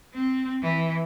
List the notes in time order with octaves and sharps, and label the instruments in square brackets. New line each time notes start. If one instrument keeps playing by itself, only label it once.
[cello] C4
E3